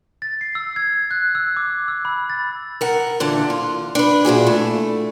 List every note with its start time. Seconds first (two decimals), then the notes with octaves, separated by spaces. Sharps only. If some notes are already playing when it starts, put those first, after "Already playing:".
0.22 A6
0.41 C7
0.55 E6
0.76 G#6
1.11 F#6
1.35 E6
1.57 D6
1.88 E6
2.05 B5
2.30 A6
2.81 A#4 F#5
3.20 A#2 D3 E3 D4 F#5
3.50 F4
3.95 D4 B4
4.25 A#2 E4 F#4 G#4
4.47 A3